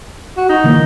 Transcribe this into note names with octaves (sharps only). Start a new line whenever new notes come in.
F#4
D#4
D3 E3 A#3